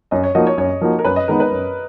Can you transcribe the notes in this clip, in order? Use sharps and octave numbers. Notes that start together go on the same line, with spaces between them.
F#2 D#5
C#5
F3 A#3 D#4 F#4 D#5
C#5
F#2 C#5
F3 A#3 D#4 F#4
A#4
F#2 B4
D#5
D#3 G#3 B3 D#4 A#4
B4
F#2